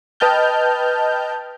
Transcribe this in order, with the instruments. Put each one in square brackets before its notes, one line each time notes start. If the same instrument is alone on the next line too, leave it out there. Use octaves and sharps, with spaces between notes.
[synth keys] B4 D#5 G5 A5 F6 G6